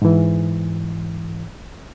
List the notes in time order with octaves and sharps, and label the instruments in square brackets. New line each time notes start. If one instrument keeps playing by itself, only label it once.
[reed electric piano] G#2 E3